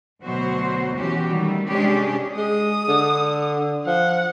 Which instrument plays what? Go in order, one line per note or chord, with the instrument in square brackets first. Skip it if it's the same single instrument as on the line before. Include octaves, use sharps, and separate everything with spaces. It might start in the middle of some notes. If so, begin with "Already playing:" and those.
[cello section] D2 B2 F#3 F#4 C5
B2 E3 F#3 C#4 F#4 G4
D#3 G3 A3
C3 G#3 C#4 D4 G4 G#4
[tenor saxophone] G#3 [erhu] D#6
[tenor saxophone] D3
[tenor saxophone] F3 [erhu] F#5